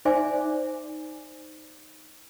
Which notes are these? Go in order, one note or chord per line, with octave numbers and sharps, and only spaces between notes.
D#4 C5 D5 E5 G#5 D6